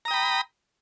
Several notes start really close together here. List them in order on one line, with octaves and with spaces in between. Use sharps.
A#5 D#6 G5 B5